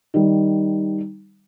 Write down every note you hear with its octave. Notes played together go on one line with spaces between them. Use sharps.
D#3 G3